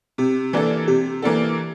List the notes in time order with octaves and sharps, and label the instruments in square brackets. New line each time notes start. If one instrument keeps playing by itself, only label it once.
[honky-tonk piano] C3 [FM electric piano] G4
[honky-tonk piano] E3 A#3 D4 A4
[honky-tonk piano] C3 [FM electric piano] G4
[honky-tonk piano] E3 A#3 D4 A4